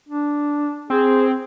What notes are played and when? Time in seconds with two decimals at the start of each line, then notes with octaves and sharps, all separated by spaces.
0.09 D4
0.90 C4 G#4